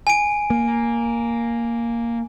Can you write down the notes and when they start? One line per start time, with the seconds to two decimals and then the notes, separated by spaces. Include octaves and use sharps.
0.07 G#5 D7
0.50 A#3